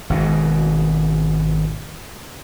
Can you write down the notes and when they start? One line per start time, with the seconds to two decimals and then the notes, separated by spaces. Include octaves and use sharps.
0.10 G#1 G#2 B2